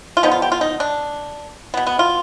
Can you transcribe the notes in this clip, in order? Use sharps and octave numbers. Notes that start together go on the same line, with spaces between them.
F4
D3 F3 B3 D#4
F4
G4
F4
D#4
D4
B2 B3
B3
F4